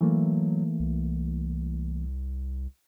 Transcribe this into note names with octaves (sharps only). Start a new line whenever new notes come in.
E3 F#3 A3 A#3
C2